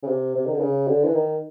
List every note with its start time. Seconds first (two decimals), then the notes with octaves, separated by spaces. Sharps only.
0.03 C#3
0.07 C3
0.35 C3
0.46 D#3
0.54 D3
0.61 C#3
0.88 D3
1.05 E3
1.14 D#3